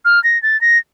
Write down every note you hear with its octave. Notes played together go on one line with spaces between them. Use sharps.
F6
A#6
A6
A#6